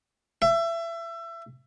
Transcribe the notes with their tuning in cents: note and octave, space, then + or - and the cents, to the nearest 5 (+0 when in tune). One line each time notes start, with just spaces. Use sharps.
E5 +25